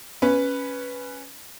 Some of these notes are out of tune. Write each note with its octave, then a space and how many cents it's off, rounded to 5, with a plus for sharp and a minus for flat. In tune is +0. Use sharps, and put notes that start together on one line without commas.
C#4 +0 B4 +0